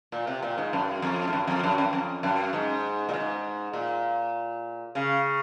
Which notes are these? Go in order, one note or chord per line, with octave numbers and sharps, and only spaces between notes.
A#2
C3
A#2
G#2
F#2
F2
G#2
F#2
F2
F#2
F#2
F2
F#2
G#2
A#2
G#2
A#2
C#3